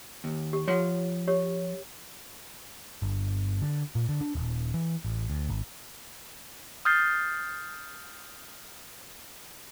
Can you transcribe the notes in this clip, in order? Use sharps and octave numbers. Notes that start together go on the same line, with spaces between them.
D#2
G4
F3 C#5 F#5 C6
G4 C#5
G1
D3
A#2
D3
D4
D#1
E3
A1
D2
G#1
D#6 F6 G6 A6 C7